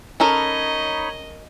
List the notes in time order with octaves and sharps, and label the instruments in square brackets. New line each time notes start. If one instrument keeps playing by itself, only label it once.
[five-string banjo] C#4 A4 A#4 [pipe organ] D#4 C#5 B5 [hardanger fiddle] D#5